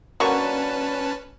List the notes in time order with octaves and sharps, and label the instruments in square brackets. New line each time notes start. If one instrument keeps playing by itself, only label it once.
[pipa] D3 C#6 [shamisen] F#3 A#3 [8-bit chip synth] C#4 B4 A5